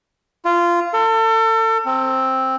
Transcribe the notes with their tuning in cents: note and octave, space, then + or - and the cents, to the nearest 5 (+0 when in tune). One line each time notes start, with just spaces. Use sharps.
F4 -15
A4 +35
C4 +5